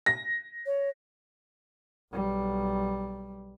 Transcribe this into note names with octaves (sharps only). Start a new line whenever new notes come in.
A#6
C#5
B1 G3